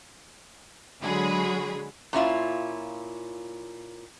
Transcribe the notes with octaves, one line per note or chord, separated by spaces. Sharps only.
D3 F#3 G#3 F#4 G#4 B5
A#2 C#4 E4 F4